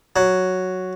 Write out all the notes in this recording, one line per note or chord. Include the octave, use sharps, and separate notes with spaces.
F#3